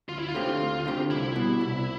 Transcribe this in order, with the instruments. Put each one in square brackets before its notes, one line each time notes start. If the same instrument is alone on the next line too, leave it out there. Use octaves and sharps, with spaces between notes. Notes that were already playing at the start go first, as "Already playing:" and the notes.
[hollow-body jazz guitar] D2 [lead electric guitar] F4
[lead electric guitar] E4
F4
[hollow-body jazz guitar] D3 A3 C4 G4
D2
D3 A3 C4 G4
[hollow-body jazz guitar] C2 [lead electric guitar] E4
[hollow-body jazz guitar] B2 G3
C2